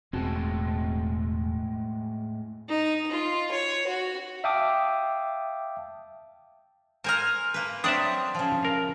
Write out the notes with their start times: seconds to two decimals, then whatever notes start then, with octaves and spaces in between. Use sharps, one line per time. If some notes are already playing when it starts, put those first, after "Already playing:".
0.13 E1 A2 G#3 C4 F#4 A5
2.69 D#4
3.11 F4
3.51 C#5
3.87 F#4
4.44 E5 F5 G5 A5 D6 D#6
7.04 A#4 C5 G#5 A#5 F6
7.54 A#3 B4
7.84 F#3 C4 D4 D5 E5 D#6 F#6
8.35 C#3 F3
8.63 A#4 F5